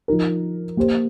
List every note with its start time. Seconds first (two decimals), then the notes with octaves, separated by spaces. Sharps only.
0.08 F3 D#4 A#4
0.77 A#3 G4 C5